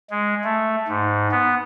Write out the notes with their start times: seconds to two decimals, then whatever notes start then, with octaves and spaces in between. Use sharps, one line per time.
0.10 G#3
0.44 A3
0.88 G#2
1.31 B3